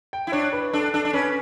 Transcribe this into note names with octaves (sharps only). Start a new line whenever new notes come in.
G5
E4
D4 C#5
B4
D4 A4
D4 A4
D4
C#4 B4